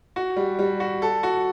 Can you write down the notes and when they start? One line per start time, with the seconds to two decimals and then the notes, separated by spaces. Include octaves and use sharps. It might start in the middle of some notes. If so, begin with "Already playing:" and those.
0.16 F#4
0.36 G3
0.59 G3
0.80 F#4
1.02 A4
1.23 F#4